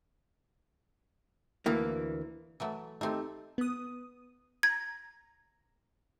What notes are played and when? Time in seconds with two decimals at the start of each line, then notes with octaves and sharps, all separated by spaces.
1.66 D2 E3 A#3
2.60 E3 F#3 A3
3.01 A3 C4 D#4 G4 A4
3.58 B3 D#6
4.63 A#5 G#6